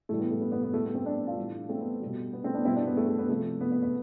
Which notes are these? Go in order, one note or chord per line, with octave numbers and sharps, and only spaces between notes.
A2 E3 G3 A3
B3
A3
B3
B3
B3
A2 G3 A3
B3
A3 C4
B3 D4
D4 F4
A2 E3 G3
A3 C4
B3
B2 G3
B3
A3 C4
B3 D4
B2 G3 C4 E4
B3 D4
B3
A3
A3
B3
C3 F3 A3
B3
B3
B3